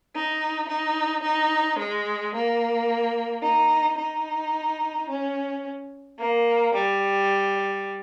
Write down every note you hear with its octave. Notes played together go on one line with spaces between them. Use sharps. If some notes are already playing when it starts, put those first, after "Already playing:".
D#4
D#4
D#4
G#3
A#3
D#4
D#4
C#4
A#3
G3